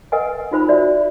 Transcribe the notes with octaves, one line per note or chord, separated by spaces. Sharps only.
A#4 B4 D#5 F#5 G#5
D#4 F4 C5 B5
F#4 D5 E5